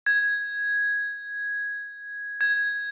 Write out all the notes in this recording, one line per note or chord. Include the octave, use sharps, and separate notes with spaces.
G#6
G#6